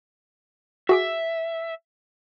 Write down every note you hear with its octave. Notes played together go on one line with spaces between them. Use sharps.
F#4 G#4 E5 D6